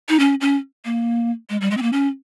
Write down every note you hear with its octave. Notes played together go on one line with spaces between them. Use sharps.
D#4
C#4
C#4
A#3
G#3
G3
G#3
C4
A#3
C#4